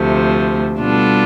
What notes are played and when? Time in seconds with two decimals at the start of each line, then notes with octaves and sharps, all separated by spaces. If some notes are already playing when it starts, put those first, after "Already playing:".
Already playing: D2 C3 F3 A3
0.78 B2 G3 D4 F4 A4